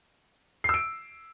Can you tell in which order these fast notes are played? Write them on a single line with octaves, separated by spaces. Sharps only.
C7 E6 D7